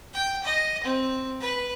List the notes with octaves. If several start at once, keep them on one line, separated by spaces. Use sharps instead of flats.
G5
D#5
C4
B4